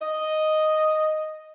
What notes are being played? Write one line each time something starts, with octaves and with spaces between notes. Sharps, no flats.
D#5